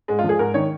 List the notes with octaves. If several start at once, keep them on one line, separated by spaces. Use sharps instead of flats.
G#2 G#3
F4
F3
G#4
G#2 A#4
D#3 C#5